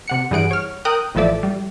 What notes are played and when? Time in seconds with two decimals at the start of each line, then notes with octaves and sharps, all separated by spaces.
0.08 C3 F#5 C#7
0.31 G2 E3 G#4 F#5 D7
0.51 C#5 F6
0.85 A#4 G5 D#6 F#6
1.15 A1 E3 F3 A4 D5 E5
1.43 G3